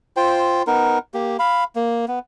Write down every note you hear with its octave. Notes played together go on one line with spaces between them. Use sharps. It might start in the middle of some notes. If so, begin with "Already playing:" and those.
F4 C5 G5
B3 D#4 A#4
A#3 G4
F5 B5
A#3
B3